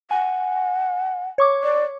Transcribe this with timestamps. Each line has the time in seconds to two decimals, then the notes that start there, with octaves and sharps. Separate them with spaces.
0.11 F#5 G#5
1.38 C#5 C#6 D6
1.63 D5